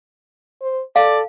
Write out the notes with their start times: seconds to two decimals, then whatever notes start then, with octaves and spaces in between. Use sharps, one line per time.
0.61 C5
0.96 A4 D5 F5